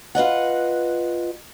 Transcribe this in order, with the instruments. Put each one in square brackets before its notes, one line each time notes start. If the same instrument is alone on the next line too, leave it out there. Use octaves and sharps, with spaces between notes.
[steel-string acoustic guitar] F4 B4 D#5 F#5